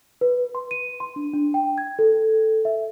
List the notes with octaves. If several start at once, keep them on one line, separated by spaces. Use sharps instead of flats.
B4
C6
D#7
C6
D4
D4
G5
G#6
A4
E5